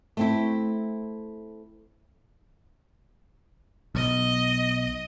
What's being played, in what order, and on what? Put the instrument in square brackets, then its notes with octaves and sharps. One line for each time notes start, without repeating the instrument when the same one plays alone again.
[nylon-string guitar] A3 C4 E4
[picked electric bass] B1 [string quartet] D#5